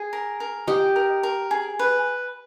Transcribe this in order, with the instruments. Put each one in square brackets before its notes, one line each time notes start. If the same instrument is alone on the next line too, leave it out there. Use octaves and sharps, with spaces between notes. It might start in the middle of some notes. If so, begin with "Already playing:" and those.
Already playing: [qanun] G#4
[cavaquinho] A#4
A#4
[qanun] G4 [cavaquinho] D#5
[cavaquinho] A#4
A#4
G#4
B4